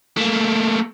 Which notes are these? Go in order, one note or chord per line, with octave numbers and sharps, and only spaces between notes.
A3 A#3